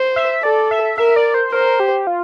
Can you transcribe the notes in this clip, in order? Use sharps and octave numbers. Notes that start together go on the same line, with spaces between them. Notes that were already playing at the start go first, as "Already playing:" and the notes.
Already playing: C5
E5
A4 D5
E5
A#4 E5
D5
C5
A#4 C5
G4
F4